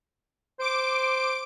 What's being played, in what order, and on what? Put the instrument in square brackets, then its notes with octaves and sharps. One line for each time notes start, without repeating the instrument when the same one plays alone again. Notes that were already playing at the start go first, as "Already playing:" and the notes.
[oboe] C5 [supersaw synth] D6 D7